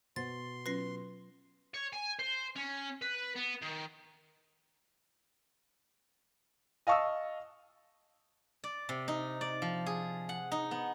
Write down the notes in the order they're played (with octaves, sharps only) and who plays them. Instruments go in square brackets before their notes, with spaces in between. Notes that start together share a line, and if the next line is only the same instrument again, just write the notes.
[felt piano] B2 [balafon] C5 F#5 [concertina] C6 [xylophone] A6
[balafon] F#3 C#4 F4 [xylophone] B4 A#6 C7
[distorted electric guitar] C#5
G#5
C5
C#4
B4
B3
D#3
[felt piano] D#5 F5 A5 C#6 D#6 E6
[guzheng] D5
C3
D#4
D5
F3
G#4
F#5
D#4
B3